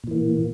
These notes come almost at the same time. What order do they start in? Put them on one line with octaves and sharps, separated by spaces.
A#2 E3 A#3